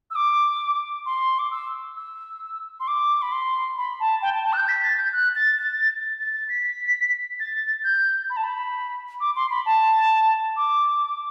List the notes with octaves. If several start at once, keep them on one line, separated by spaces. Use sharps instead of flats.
E6
D6
C6
D6
E6
E6
C6
D6
B5
C6
B5
A5
G5
A5
A5
F#6
G6
B6
A6
G6
F#6
A6
A6
A6
A6
B6
A6
G6
B5
A5
B5
D6
C6
B5
A5
D6